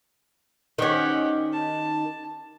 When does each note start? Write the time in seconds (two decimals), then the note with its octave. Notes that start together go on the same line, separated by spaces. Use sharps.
0.78 D#3 C#4 G4 F#5
1.53 A5